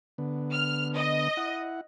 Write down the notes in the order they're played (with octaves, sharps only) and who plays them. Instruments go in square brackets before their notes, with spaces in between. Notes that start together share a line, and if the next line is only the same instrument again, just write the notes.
[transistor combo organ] D3 B3
[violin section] F6
D#5
[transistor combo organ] E4 F#5